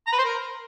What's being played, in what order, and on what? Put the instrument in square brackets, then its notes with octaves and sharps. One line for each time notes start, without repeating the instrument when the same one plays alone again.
[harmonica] A#5
B4
C5
A#4